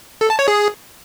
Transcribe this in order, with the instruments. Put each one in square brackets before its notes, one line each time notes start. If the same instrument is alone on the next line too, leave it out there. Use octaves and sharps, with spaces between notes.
[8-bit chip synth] A4
A5
C#5
G#4